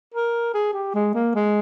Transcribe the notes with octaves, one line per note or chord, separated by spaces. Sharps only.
A#4
G#4
G4
G#3
A#3
G#3